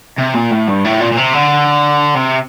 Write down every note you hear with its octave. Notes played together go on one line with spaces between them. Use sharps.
C3
A#2
A2
G2
A2
A#2
A#2
C3
D3
C3